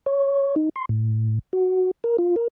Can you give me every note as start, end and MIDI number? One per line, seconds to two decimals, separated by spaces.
0.06 0.55 73
0.56 0.69 63
0.76 0.85 84
0.89 1.39 45
1.53 1.91 66
2.04 2.17 70
2.18 2.36 65
2.36 2.48 70